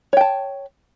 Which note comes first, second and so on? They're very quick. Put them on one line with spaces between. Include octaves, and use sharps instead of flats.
C#5 G5 A5